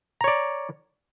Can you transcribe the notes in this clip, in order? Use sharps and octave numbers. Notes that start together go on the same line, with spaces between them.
C#5 D5 A#5